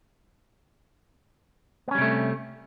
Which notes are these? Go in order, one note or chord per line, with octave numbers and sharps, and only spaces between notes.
C3 G3 A3 B3 C#4